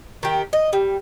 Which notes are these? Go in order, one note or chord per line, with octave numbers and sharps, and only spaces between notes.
D#3 G4
D#5
G3